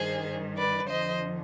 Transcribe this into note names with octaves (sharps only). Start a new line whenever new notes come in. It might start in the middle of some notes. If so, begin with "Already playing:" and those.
Already playing: G2 D#3 G3 G#4 C5
B4 D5
F2 D3 F3 C5 D#5